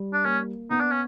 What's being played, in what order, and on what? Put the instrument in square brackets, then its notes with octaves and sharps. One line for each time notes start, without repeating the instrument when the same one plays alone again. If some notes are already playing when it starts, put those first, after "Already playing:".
Already playing: [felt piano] G3
[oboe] D4
[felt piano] A#3 [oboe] C#4
[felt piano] B3 [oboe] D#4
[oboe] D4
C#4